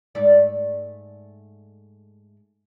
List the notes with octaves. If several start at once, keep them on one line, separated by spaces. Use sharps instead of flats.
G#2 A3 D5